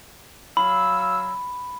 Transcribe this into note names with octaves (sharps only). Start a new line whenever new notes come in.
F#3 F5 B5 E6